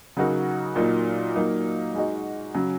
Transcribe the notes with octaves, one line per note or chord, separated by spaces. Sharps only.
C#3 F#3 D#4 F#4 A#4
A#2 F#3 A#3 D#4
F#3 A#3 D#4
G#3 D#4 F#4 D#5
C#3 F#3 C#4 G#4